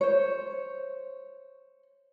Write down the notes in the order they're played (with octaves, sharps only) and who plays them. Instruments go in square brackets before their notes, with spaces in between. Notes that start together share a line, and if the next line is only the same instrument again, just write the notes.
[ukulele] C5 C#5